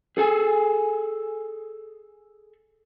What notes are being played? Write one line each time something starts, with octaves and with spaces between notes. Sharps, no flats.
G#4 A4 G#5